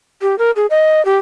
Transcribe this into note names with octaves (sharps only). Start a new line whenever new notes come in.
G4
A#4
G#4
D#5
G4